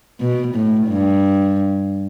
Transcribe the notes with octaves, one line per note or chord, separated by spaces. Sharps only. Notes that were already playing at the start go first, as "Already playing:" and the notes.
B2
A2
G2